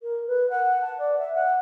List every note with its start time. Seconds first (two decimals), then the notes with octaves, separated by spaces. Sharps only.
0.01 A#4
0.27 B4
0.50 F#5
0.82 A5
0.98 D5
1.18 E5
1.34 F#5